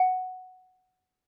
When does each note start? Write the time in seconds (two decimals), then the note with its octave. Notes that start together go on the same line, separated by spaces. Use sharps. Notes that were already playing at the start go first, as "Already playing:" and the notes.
Already playing: F#5